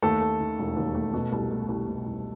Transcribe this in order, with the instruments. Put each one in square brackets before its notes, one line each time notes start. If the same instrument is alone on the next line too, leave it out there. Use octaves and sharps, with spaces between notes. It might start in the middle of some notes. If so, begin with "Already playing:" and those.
[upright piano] D#2 A3 A4
A3
D#3
E1
D#2
A3
B2
C2
A3
C2
B2
C2